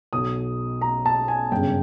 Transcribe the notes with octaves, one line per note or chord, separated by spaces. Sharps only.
B1 B2 D#6
A#5
A5
G#5
G1 F#2 C#3 G5